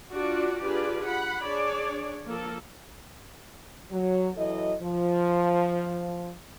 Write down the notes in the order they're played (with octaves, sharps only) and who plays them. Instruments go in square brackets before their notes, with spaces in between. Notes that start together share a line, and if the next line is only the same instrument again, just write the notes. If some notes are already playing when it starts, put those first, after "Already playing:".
[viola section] D4 F4 F#4 D5
D4 F4 G4 G#4 B4 D5
F#5 B5
D4 G#4 C#5 D5
F3 A#3 A4
[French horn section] F#3
E3 F#3 E4 A4 D#5
F3